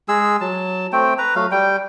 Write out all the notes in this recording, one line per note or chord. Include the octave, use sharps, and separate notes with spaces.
G#3 G#4 E6
F#3 A5
A3 C4 G5
B4 A#5
F#3 A3 F5
G3 G5